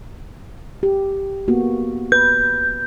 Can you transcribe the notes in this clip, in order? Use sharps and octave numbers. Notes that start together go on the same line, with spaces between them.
G4
A#3 B3 F#4
B4 G6